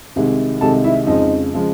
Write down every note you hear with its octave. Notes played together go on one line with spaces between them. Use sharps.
C2 C3 D#3 G#3
C2 C3 D#3 G#3 A4 A5
E4 E5
F2 C#3 F3 G#3 D#4 D#5
C#3 F3 G#3